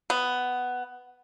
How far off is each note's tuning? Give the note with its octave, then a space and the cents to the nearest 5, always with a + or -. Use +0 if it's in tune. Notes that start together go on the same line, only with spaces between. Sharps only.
B3 +10